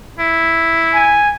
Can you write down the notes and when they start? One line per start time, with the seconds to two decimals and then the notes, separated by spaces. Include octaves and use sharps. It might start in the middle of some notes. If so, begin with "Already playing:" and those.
0.19 E4
0.95 G#5